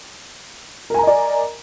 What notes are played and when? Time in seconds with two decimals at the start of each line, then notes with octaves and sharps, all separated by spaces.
0.90 A#4
0.94 G#5
0.99 A#5
1.03 D#5
1.07 D5